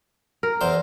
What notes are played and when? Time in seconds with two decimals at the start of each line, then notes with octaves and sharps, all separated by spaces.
0.43 A#4
0.61 E2 C5